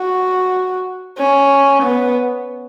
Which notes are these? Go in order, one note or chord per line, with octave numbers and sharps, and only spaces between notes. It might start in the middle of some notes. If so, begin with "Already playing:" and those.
Already playing: F#4
C#4
B3